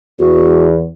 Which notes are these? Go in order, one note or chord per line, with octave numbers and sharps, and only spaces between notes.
E2 F#4